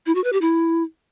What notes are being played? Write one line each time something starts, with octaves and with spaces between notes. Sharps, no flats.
E4
F#4
B4
G4
E4